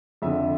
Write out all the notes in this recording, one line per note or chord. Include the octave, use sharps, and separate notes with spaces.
F2 D3 E5